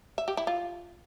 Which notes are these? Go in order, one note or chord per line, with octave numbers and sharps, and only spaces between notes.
E5
G4
E4
F4